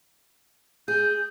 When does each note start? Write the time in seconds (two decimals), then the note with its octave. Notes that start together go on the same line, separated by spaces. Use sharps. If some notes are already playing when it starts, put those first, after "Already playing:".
0.88 G#4 G6